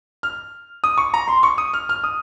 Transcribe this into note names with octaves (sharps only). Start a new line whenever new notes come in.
F6
D#6
C#6
A#5
C6
C#6
D#6
F6
F6
D#6